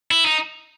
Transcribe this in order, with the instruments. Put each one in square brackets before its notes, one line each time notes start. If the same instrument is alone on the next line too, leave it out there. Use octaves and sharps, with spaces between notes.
[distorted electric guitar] E4
D#4